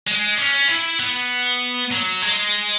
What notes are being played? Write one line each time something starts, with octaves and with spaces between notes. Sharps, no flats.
G#3
C#4
E4
B3
F#3
G#3